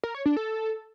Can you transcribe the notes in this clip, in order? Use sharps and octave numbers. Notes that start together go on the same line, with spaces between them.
A#4
C#5
D4
A4